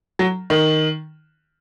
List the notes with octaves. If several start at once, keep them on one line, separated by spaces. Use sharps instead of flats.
F#3
D#3